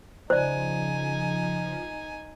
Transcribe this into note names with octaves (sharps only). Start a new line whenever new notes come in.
C#3 F3 D#4 C5 D5 G#5